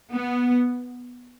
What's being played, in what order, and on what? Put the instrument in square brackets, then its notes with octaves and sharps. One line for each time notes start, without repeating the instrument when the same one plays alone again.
[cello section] B3